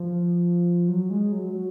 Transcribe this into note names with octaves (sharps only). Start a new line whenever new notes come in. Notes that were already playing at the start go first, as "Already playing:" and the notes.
Already playing: F3
F#3
G#3
F#3
F#3
F#3